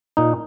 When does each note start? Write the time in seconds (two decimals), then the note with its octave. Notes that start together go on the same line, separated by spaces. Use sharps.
0.17 A#2 D#4